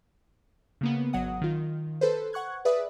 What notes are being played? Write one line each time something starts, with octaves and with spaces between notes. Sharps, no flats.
C#3 A#3 B3
G#1 F#3 F#5 D#6
D#3 F4
A4 B4 C5
F#5 C#6 F#6 G#6
G#4 B4 D5 E5 D#6